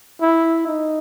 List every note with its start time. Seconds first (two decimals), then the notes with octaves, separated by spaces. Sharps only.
0.22 E4
0.67 D#4